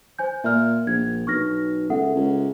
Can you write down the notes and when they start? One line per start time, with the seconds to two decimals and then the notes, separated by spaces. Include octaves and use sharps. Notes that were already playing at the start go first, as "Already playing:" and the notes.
0.19 C5 G#5 G6
0.44 A#2 E5 F6
0.87 A#1 G#6
1.27 B1 C#6 F6 A#6
1.90 C#2 A4 E5 F#5
2.16 C#2